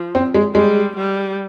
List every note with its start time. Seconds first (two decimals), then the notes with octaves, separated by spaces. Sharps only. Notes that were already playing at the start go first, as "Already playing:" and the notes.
Already playing: F3
0.15 C4
0.34 G#3
0.55 G3 G#3
0.96 G3